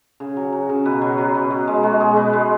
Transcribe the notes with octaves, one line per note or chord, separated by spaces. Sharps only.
C#3
F#3
F#3
C#3
B2 B4
F#3 C#5
F#3 B4
B2
B2
G#3
G#3 F#4
B2 G#4
B2 B4
G#3